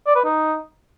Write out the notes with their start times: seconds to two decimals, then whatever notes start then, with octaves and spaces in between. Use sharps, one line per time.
0.07 D5
0.16 B4
0.24 D#4